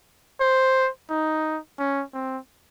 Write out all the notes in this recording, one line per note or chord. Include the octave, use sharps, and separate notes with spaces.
C5
D#4
C#4
C4